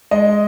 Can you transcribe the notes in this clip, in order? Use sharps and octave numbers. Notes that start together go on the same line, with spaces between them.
G#3 D#5